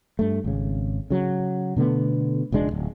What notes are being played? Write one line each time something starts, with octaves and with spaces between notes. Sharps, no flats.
G2 A3
G#1 C#3
C#3 F#3
B2 D3 A3 B3
E1 C#2 G#3 D4
D1 A#1